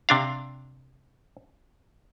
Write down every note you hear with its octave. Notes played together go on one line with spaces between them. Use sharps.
C3 D4 F5